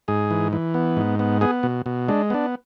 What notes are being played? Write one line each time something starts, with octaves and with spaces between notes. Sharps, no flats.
G#2 G#4
E3
E3
B3
G#2
B3
B3 G#4
B2
B2
G#3 D4
B3 D4